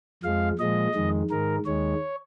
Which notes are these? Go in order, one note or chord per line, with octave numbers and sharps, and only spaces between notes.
F2 F3 G#3 F5
A#2 F3 G#3 D#5
F2 D#3 G#3
G#2 D#3 G#3 A#4
D#2 D#3 G#3 C#5